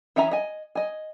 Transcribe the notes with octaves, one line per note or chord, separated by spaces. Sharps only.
E3 C#4 E5 G#5 A#5
D#5 G#5
D#5 G#5